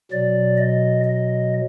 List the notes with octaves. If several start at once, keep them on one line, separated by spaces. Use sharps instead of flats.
B2 F#3 D5
D#5
D#5